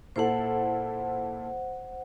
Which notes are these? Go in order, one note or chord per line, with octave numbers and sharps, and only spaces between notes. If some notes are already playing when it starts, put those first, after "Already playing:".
A#2 E4 A4 C5 F#5